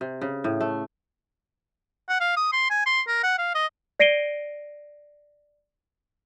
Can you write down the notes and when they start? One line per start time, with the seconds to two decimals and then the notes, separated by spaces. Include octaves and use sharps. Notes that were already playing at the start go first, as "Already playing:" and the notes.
0.01 C3
0.21 C#3
0.44 A2
0.61 A3
2.09 F#5
2.21 F5
2.37 D#6
2.53 C6
2.70 G#5
2.86 C6
3.07 A#4
3.24 F#5
3.38 F5
3.55 D#5
4.00 D5 A#6 C7 D7 D#7 G7